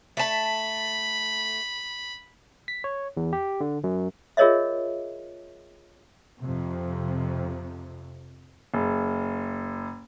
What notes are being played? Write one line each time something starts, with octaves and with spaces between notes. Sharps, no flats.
A3 A5 B5
B6
C#5
E2
G4
D3
F#2
F4 G#4 A#4 C#5 D#5 E5
F2 C3
F#1